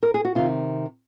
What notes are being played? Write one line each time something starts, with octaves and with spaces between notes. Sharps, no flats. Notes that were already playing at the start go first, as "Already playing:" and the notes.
A#4
G#4
F#4
C3 D#3 F4